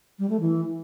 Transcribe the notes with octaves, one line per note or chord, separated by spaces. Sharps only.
G3
A3
E3